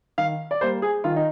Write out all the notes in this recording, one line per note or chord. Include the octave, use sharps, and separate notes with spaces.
D#3 F5
D5
G3 A#3 C5
G#4
D#3 F4
D#4